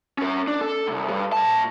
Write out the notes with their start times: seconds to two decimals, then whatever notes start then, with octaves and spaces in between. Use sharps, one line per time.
0.18 C#4 A#4
0.48 D4
0.61 A4
0.87 C2 G#2
1.10 G2
1.33 A#2 A5